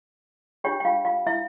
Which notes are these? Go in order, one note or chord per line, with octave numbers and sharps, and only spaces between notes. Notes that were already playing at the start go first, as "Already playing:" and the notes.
D4 F4 G4 C#5 G5
G5
F4 F5
F4 F5
E4 E5